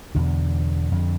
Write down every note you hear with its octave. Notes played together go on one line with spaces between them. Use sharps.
E2 B2 D3
F2 D3